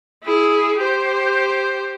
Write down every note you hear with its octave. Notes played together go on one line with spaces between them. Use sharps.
E4 G#4
G4 C5